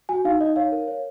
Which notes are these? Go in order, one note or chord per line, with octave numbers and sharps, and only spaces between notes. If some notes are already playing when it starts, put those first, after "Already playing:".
F#4 G#5
D#4 F5
D#4 D#5
C#5 F5
A#4
C#5